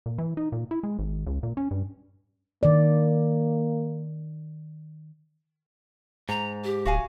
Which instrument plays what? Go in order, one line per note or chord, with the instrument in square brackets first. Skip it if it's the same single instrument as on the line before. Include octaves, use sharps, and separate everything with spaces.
[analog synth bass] A#2
E3
D#4
A#2
E4
G#3
G#1
C#2
A#2
C#4
G2
[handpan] D#3 D5 [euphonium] A#3
[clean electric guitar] G#2 [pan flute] A#5
[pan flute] G4
[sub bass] D1 [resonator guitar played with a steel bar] F#4 F5 G#5